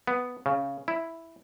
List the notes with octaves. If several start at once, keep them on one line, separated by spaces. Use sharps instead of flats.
B3
C#3
E4